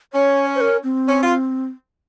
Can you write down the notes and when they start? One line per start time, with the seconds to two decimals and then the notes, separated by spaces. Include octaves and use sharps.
0.13 C#4 C#5
0.55 C5
0.61 A#4
0.84 C4
1.08 C#4
1.23 F4